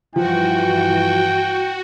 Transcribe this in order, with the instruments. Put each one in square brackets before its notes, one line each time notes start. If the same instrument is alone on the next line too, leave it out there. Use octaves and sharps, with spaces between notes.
[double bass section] G2 E3 [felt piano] F3 [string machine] F#4 [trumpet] G5